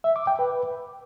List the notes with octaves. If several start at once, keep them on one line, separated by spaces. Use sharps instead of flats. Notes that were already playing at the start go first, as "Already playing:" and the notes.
E5
D6
G5
B4